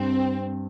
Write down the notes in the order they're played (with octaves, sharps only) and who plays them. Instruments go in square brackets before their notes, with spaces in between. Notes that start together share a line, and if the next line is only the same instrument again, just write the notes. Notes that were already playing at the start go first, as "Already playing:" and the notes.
Already playing: [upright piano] G2 [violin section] C4